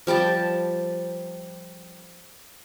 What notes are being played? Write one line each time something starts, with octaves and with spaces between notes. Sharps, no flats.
F3 G3 G5 A5